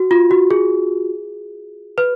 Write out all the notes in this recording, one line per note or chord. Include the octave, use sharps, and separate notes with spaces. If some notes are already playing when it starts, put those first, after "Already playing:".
Already playing: F#4
F4
F#4
G#4
B4